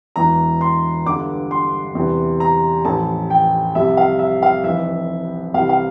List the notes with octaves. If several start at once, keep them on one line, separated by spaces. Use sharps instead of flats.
E1 E2 E3 A#5
C6
G1 G2 D3 D6
C6
E2 C3 E3
A#5
A1 A2 F3 A5
G5
C2 C3 F3 E5
F5
E5
F5
F1 F2 E3 E5
C2 C3 E3 F5
F5